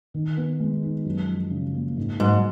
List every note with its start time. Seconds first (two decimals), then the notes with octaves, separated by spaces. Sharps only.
0.14 D#3
0.37 B3
0.60 G#3
0.83 D#4
1.05 F#2
1.28 F3
1.51 C#3
1.74 A#3
1.97 G#2
2.19 G#2 F#3